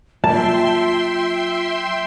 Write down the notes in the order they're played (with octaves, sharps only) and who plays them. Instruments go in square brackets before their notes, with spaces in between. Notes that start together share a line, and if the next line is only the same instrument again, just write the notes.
[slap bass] F#3 A#3 D4 [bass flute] F4 [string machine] E5 G5 C6 [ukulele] A5